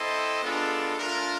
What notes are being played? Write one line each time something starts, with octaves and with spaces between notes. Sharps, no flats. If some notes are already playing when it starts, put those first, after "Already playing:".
Already playing: C4 E4 A4 C5 D#5
G#3 B3 D4 F4 A4
A3 D4 F4 A#4